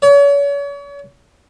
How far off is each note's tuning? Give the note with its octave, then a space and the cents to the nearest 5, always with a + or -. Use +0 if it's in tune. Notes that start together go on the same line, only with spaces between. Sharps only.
C#5 +40